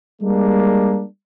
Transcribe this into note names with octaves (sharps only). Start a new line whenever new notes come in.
G3 G#3 A#3 D4